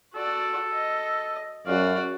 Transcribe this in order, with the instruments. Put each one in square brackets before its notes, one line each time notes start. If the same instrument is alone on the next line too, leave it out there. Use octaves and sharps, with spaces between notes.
[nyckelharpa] F#4 D5 [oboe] A4
[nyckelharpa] D#5
[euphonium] F#2 [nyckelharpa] F#4 D5 [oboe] F5